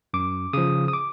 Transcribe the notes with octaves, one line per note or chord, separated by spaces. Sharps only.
F#2 D6
C#3 F3 D#6
D#6
D6